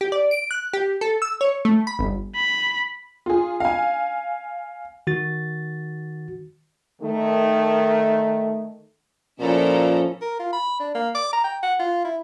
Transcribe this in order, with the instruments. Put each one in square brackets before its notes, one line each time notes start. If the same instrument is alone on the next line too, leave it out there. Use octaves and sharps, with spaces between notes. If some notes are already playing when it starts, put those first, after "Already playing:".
[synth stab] G4
D5
D7
F#6
G4
A4
E6
C#5
A3
B5
G1
[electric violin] B5
[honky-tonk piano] F4 G#4
F5 G#5
[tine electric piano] D#3 F#4 A6
[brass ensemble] D#3 A3
[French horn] A#2 [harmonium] F3 C#4 [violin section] E4 A4 A#5
[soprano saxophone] A#4
F4
B5
D4
A#3
D6
A#5
G5
F#5
F4
E4